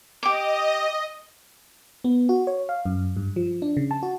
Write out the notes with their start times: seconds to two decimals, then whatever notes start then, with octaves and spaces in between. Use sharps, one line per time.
0.23 G4 D#5 D6
2.04 B3
2.29 F#4
2.47 C#5
2.69 F5
2.85 F#2
3.17 G2
3.36 F3
3.62 D4
3.77 C#3
3.91 A5
4.03 F#4